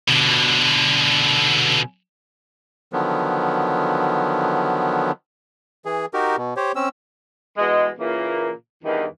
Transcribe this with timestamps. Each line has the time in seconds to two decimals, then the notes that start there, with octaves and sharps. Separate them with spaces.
0.08 B2 D3
2.93 D3 D#3 F3 F#3 B3
5.85 E3 G#4
6.14 D#4 F#4 G4 A#4
6.38 B2
6.57 G4 C5 C#5
6.76 C4 C#4 E6
7.58 B2 E3 G#3
7.99 A#2 C#3 E3 A#3
8.83 E2 G2 D#3 E3